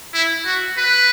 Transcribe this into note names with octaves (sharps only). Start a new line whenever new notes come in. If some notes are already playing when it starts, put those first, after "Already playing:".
E4
F#4
B4